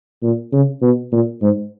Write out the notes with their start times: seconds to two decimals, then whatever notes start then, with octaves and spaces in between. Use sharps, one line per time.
0.23 A#2
0.53 C#3
0.82 B2
1.12 A#2
1.42 G#2